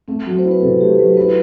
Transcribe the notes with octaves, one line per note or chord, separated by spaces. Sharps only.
A3 C4
F#3
C5
E4
B4
C3 A4
A3 G4
F#3 B4
E4 B4